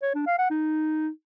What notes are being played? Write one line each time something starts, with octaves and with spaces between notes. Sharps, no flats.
C#5
D4
F5
F#5
D#4